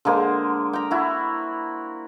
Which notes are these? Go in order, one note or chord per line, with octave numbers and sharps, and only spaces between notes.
D3 G#3 A#3 C5
G5 A#5
E4 F#4